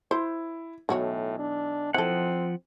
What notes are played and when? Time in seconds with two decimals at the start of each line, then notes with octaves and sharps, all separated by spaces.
0.11 E4 C5
0.89 B1 A2 E3 F#4 C#5
1.39 D4
1.94 F3 C4 E4 A4 F#5